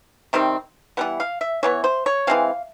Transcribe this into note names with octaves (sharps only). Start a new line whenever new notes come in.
C3 D#3 G3 C4
E3 G3 B3 F#5
F5
E5
E3 G3 B3 C#5
C5
C#5
E3 G#3 C4 F5